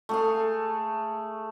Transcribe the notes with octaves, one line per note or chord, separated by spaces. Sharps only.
A3 G#4 F5